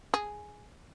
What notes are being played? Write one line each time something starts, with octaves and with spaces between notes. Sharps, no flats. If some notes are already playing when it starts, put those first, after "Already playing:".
G#4